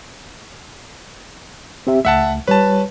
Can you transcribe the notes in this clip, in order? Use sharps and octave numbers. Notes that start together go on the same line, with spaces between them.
C4 G4 E5
C#2 A3 E5 F#5 A5
G3 B4 C#5 A5